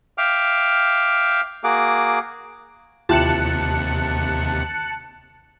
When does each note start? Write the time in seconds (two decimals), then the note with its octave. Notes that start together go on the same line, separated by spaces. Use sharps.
0.18 E5 F5 G5 D6 F6
1.64 A#3 F#4 G#4 F#5 D6
3.09 D#2 C3 E4 F4 G4 A5 F#6 C#7